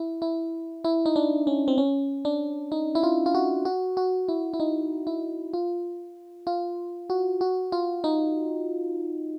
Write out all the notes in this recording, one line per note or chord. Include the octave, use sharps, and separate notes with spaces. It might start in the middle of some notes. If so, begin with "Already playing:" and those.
Already playing: E4
E4
E4
D#4
D4
C#4
C4
C#4
D4
D#4
E4
F4
F4
F#4
F#4
F#4
E4
E4
D#4
E4
F4
F4
F#4
F#4
F4
D#4